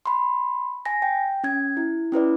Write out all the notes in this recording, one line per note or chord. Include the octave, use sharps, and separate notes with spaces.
B5 C6
G#5 A#6
G5
C#4 G#6
E4
C#4 E4 B4 D5